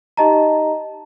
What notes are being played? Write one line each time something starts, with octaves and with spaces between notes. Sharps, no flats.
D#4 G4 D#5 A5 A#5